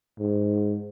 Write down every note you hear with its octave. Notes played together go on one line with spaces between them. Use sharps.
G#2